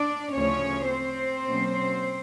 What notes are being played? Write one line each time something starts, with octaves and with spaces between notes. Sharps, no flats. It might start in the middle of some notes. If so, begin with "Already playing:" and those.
Already playing: D4 D5
D2 C#3 F3 A3 C#4 C#5
C4 C5
B2 F#3 A#3 C#4